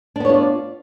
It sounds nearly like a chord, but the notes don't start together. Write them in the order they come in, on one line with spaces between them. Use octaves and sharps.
D4 B3 C#5 F4 D5